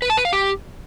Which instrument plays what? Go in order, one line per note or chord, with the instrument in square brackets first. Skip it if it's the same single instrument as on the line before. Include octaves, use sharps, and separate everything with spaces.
[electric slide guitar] B4
A5
B4
F5
G4